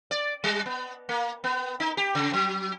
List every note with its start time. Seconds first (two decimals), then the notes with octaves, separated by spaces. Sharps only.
0.11 D5
0.44 G3
0.66 B3
1.09 A#3
1.44 B3
1.80 D#4
1.97 G4
2.15 C#3
2.33 F#3